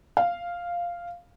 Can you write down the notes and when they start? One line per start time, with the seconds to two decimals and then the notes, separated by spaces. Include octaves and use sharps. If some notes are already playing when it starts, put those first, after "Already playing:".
0.17 F5